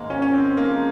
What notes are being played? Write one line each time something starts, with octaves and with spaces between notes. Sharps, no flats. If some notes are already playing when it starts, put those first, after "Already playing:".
Already playing: G#2 D#3 G#3 A#3
C#4
C#4
C4
F3 G#3 A#3 D#4